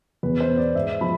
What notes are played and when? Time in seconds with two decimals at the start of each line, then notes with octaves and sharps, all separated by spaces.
0.23 E2 B4
0.40 C5
0.50 B2
0.58 D5
0.75 G#2 E5
1.01 F3 B5